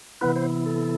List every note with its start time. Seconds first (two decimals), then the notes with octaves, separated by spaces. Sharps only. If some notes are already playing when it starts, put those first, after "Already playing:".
0.21 C3 E3 B3 E4 B4
0.36 C5
0.66 A4